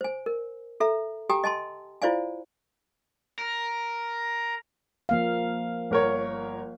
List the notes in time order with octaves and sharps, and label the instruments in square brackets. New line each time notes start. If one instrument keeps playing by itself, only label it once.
[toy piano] C5 G#5
A#4
A4 E5 A#5
G4 G5 G#5 A#5 D#6
D#5 G#5 A5 C6
E4 F4 C5 D5 F5 G#5
[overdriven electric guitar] A#4
[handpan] F3 A#3 F5
[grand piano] G1 A#4 C#5